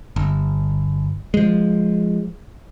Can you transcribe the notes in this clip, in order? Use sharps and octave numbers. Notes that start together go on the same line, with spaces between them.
G1
F3 G#3